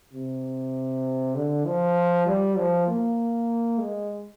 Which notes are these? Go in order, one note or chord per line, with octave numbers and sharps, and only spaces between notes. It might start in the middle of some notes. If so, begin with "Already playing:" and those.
C3
D3
F3
G3
F3
A#3
G#3